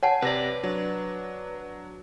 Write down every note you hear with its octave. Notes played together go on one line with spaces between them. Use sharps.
C#5 F#5 G#5 A5
C3 B4 D5 A#6
F#3 D4